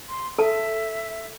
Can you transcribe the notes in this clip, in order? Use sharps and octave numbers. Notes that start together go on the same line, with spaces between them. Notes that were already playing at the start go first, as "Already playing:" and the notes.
C6
A4 E5 A5